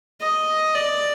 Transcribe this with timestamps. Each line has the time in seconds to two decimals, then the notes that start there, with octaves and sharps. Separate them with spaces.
0.21 D#5
0.75 D5